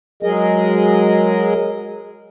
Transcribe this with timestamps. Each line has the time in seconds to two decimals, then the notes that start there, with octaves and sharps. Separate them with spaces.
0.23 F#3 G#3 G#4 A#4 D#5